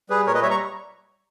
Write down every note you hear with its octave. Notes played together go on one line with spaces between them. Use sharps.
G3 G#4 B4
A#2 A#4 C#5
B4 D#5
G3 C#5 E5
A#5 C#6